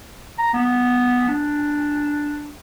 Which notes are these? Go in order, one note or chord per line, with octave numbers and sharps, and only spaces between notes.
A#5
B3
D4